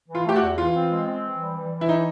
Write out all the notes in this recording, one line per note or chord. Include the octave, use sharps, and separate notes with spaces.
E3
F4
A3 G4
F#4
E2
E3 F4
C4
G#3
C4
E3
G3
E3
E3
E4
D#4